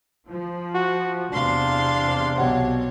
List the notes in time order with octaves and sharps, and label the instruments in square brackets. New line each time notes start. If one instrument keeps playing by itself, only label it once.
[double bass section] F3
[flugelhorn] F#4
[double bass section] E2 C3 [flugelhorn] D4 [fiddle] F5 C6
[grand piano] B1 G4 F#5 [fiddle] C#5